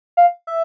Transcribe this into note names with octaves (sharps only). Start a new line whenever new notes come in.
F5
E5